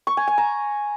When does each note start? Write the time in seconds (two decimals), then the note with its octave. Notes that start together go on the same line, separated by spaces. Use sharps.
0.07 C#6
0.17 G#5
0.27 G#5
0.38 A#5